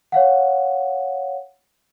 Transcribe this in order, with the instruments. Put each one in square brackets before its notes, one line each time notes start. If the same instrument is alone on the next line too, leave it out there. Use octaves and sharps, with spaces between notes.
[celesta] C#5 F5 F#5